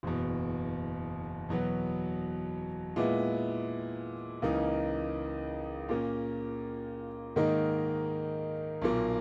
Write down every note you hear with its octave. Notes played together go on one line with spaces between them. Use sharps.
F#1 E2 B2
E2 B2 F#3 B3
A#2 G#3 B3 E4
C#2 C#3 E3 A#3 D#4
A#2 A#3 C#4
G#2 D#3 A#3 D#4
B1 A#2 A#3